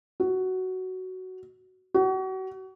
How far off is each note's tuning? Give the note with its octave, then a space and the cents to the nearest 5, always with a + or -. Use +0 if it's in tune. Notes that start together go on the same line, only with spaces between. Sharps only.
F#4 +10
F#4 +35